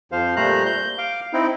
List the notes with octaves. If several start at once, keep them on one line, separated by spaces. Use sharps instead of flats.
F2 F3 C5 F5
A#2 G3 A3 C5 A#5 F#6
G6
F5 D6
C4 D#4 E4